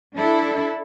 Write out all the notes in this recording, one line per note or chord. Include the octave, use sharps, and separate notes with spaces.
D4 E4 A4